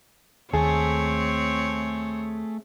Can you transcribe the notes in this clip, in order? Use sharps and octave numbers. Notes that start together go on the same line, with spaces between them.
D#2 A3 C4 G#4 C#5 A5